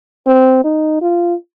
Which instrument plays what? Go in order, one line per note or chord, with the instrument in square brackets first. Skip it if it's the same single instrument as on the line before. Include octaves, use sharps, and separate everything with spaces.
[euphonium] C4
D#4
F4